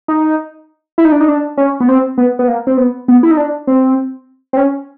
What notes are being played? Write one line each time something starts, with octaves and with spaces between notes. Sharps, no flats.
D#4
E4
D#4
D4
D#4
D4
C#4
B3
C4
B3
B3
A#3
C4
B3
B3
E4
D#4
D4
C4
C4
C#4